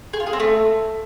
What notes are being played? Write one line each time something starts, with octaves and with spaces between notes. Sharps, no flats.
G#4
F4
G#4
C4
A3